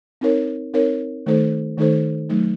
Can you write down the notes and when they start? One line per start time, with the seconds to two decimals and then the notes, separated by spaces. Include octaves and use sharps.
0.21 C4 D#4 A#4 C#5
0.74 C4 D#4 A#4 C#5
1.26 D#3 A3 D#4 A4 C5
1.78 D#3 A3 D#4 A4 C5
2.29 F#3 A3 D#4